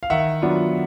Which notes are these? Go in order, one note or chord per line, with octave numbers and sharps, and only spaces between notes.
F5
D#3 E5 F#5
F#3 B3 D4 F4